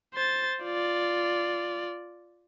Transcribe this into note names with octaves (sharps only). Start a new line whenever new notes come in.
C5 A6
F4 D5